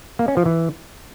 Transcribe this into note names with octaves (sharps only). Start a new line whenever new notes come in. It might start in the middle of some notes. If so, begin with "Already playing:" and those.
A#3
C#4
F3
E3